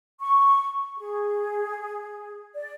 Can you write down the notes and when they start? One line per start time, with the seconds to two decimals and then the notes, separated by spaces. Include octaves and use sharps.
0.21 C#6
0.97 G#4
2.55 D5